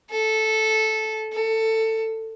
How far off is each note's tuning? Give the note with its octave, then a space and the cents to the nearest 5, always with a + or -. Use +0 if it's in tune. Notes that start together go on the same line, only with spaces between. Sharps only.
A4 -10
A4 +20